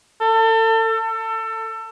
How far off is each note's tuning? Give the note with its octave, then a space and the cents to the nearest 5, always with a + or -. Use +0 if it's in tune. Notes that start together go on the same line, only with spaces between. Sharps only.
A4 +30
A4 +25